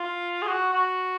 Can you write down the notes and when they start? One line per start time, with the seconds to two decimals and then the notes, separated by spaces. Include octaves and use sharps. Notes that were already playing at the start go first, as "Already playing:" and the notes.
Already playing: F4
0.42 G#4
0.47 F#4
0.73 F#4